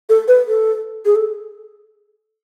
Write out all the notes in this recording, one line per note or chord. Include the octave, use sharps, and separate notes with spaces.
A4
B4
A4
G#4
A4